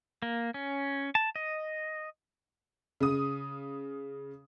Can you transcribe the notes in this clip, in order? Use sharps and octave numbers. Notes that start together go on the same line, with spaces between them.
A#3
C#4
A5
D#5
C#3 D#6